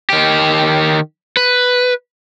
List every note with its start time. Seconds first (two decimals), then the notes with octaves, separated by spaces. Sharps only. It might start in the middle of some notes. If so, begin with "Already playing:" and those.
0.10 D#3 G4
1.37 B4